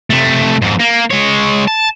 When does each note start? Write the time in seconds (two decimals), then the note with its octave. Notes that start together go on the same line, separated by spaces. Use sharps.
0.10 C3 A3
0.62 F2 G#2
0.80 A#3
1.10 G#3 C#5
1.68 A5